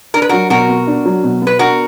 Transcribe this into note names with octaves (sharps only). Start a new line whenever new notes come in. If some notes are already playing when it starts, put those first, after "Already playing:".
D4 A#4
B4
F#3 F#4 A#4
B2 F#4 A#4
B3
D4
F#3
B2
B3 B4
D4 F#4 A#4